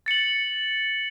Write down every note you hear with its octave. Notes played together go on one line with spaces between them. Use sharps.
A6 C#7 F#7